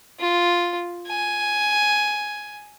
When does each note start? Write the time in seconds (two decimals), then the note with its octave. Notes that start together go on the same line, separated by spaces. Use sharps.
0.20 F4
1.07 G#5